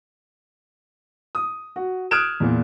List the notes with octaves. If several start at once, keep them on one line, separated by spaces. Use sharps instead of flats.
D#6
F#4
D#6 F6 F#6 G#6 D7 E7
E2 A#2